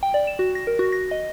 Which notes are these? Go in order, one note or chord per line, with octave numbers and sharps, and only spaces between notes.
G5
D5
E7
F#4
A#6
A#4
F#4
A#6
D#5